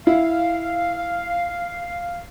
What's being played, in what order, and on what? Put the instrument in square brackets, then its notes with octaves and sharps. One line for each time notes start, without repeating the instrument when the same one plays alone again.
[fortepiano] E4 [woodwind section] F5